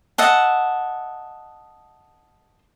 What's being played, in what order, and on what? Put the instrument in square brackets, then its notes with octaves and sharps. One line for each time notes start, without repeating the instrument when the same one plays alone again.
[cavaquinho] D#5 E5 F#5 A5